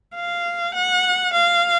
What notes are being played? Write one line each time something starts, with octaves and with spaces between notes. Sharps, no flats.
F5
F#5
F5